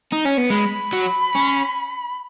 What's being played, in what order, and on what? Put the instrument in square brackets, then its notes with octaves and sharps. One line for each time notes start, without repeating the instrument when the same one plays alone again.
[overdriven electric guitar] D#4
C#4
B3
[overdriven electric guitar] G#3 [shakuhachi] B5
[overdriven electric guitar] F#3
C#4